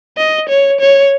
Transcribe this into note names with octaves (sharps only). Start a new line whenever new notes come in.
D#5
C#5
C#5